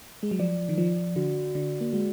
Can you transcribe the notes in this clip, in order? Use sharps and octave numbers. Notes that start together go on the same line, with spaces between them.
G#3
F#3
F3 D5
D#3
F3 D5
D3 F#4
D3 D5
A#3
G#3 F#4